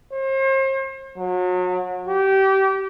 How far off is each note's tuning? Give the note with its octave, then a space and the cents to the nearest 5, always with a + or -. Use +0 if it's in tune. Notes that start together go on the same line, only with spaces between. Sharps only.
C5 +40
F#3 -35
G4 -25